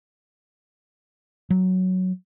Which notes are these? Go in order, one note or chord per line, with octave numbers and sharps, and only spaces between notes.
F#3